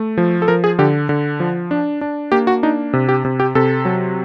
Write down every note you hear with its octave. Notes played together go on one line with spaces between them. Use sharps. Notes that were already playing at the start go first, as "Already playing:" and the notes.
Already playing: A3
F3
A4
F3 A#4
G#4
D3 G4
D3
F3
D4
D4
A#3 G4
F#4
D4 D#4
C3
G4
C3
G4
C3 A4
F#3